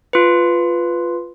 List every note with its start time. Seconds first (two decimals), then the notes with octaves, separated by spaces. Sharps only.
0.13 F4 B4